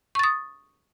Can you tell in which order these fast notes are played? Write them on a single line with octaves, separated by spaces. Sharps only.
C#6 A6 D#6